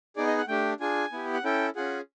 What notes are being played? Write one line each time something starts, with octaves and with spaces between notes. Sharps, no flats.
B3 D#4 G#4 D5
D#5
F#5
A3 D4 G4 G5
D4 F4 G#4 G#5
B3 E4 G4
F#5
C#4 E4 A4 G5
C#4 F4 G#4 F#5